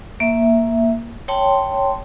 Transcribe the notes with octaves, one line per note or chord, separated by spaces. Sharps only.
A#3 E5
C#5 G5 A5 C6